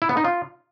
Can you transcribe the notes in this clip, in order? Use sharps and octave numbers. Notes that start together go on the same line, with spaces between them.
E4
B3
D#4
F4